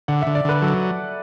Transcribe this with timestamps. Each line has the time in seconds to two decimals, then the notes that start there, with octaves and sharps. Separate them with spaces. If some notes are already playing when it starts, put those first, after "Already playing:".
0.08 D3 F#5
0.22 D3 E5
0.35 D5
0.45 D3 B4
0.62 F#3 A4